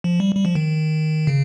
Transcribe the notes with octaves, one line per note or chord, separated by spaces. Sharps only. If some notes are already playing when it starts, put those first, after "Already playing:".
F3
G3
G3
F3
D#3
C#3